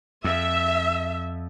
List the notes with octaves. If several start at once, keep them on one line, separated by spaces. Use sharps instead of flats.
F2 E5